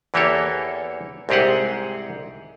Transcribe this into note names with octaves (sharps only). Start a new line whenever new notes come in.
E2 E3 A#3 G4 A4 C#5
C2 G#2 C4 G4 G#4 F#5